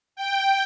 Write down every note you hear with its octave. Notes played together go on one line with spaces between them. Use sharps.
G5